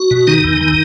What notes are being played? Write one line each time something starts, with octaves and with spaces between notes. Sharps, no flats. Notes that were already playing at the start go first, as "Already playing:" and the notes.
Already playing: F#4
B2
D#3 D#4
E2
D#3